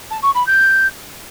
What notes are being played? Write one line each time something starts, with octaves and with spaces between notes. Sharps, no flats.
A5
C#6
B5
G6